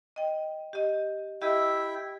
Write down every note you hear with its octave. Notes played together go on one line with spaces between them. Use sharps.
D#5 G5
G4 D#5
E4 G4 D#5 E5 G5